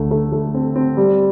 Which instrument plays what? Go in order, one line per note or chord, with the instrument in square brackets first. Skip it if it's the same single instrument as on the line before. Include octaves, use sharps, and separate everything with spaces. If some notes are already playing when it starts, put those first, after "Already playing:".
Already playing: [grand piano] D2 D3 A3
A3
A3
C4
C4
G3